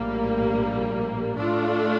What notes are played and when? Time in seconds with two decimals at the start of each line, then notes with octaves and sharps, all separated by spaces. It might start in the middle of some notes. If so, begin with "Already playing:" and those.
Already playing: A#1 A2 G3 A#3
1.38 A2 A3 D4 F4